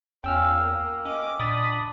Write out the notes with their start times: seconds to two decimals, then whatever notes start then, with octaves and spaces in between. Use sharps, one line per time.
0.24 E2 C#4 F4 G5 E6 F6
0.59 A#3
1.05 C#4 D#5 D6
1.39 A#2 D4 B5 D6 D#6 A6